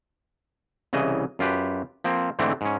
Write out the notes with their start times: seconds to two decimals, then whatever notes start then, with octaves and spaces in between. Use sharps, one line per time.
0.93 C2 C#3 E3 D#5
1.39 F#2 F4 G4 B4
2.04 F3 A#3 C4
2.39 G#2 D3 E3 A3 C4
2.61 G#2 C#4